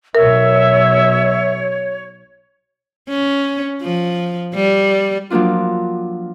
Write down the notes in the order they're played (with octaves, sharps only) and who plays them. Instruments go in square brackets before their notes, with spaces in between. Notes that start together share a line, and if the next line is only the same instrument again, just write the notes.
[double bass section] B1 B2 [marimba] A#4 [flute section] C#5 [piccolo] E5
[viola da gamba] C#4
F3
G3
[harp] F3 F#3 A#3 D4 F4